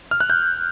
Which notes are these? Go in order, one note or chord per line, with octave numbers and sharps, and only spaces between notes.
F6
F#6
G6